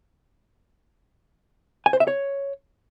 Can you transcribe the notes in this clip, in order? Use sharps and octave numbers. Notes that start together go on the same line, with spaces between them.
G#5
C5
E5
C#5